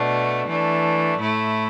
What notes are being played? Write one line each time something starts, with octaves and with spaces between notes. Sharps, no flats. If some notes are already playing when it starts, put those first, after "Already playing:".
Already playing: B2 A3 D4
E3 A3 D4
A2 A3 E4